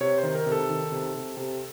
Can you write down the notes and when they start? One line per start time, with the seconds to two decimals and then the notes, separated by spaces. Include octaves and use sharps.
0.01 C3 C#5
0.18 C5
0.23 D#3
0.35 A#4
0.46 C3
0.52 A4
0.70 D#3
0.92 C3
1.14 C3
1.37 C3